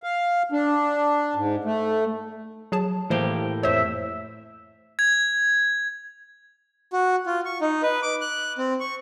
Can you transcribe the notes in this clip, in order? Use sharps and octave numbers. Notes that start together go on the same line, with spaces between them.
F5
D4
G#2
A3
F#3 G#4 A5
A2 E3 A#3 G4 C5
F2 C5 C#5 E5
G#6
F#4
F4
C#6
D#4
B4
D6
F#6
C4
C#6